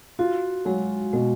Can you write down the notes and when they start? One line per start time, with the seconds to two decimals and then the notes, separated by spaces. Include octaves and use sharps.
0.19 F4 F#4
0.65 F#3 G#3
1.13 B2 G#3